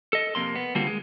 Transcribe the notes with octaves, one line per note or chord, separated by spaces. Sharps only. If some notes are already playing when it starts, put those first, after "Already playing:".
A4 D#5
F2 C3 A#3 C6
B3
D3 G3 A#3 C4 F4 F#4
G#3